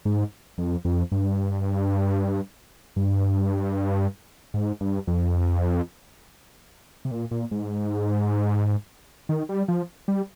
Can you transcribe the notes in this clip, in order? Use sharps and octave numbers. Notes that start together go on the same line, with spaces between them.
G#2
F2
F2
G2
G2
G#2
G2
F2
C3
A#2
A#2
G#2
D#3
G3
F3
G3